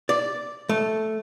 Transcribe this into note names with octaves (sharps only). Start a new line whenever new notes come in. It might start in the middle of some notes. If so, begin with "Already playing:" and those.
D5
A3